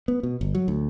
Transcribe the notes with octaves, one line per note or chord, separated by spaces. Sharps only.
B3
B2
G1
F#3
D2